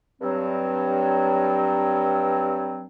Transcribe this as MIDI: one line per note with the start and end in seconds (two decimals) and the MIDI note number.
0.21 2.86 43
0.21 2.86 54
0.21 2.86 60